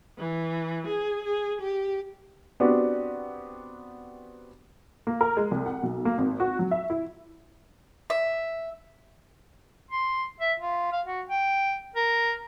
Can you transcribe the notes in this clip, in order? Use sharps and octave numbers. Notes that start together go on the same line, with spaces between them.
E3
G#4
G#4
G4
B3 C4 D4 F#4 G4
A#3
A#4
G#3
C2
F#5
B1
A#3
G#1
F#4
F#3
E5
E4
E5
C6
E5
F4
F5
F#4
G5
A#4